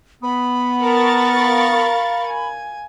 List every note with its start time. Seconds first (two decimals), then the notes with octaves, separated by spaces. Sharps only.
0.23 B3 B5
0.82 A#4 A5 C#6 A6
1.44 F5
2.27 G#5